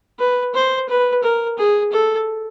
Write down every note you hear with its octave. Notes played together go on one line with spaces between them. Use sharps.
B4
C5
B4
A#4
G#4
A4